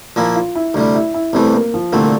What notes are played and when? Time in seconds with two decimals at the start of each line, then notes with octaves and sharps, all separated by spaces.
0.16 A#2 F3 A#3 E4 A#4
0.36 F4
0.55 E4
0.74 D2 C3 G3 E4
0.95 E4
1.14 E4
1.33 C2 C3 E3 A3 C4
1.53 A#3
1.74 F3
1.93 C2 A#2 D3 A3 C4